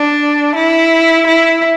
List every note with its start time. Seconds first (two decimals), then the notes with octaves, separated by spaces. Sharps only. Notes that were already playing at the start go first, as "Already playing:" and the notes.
Already playing: D4
0.55 E4
1.27 E4